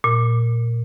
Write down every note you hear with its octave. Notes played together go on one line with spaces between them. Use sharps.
A#2